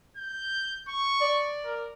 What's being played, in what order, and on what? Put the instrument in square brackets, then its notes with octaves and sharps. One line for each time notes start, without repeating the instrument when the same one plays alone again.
[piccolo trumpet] G6
C#6
[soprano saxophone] D5
[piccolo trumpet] A#4